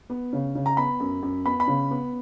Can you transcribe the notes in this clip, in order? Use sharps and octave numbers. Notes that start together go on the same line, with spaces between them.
B3
C#3
C#3
A#5
B3 B5
F#2
F#2
B3 B5
B5
C#3
B3